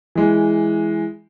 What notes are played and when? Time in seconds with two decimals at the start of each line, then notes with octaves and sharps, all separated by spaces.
0.15 E3 G#3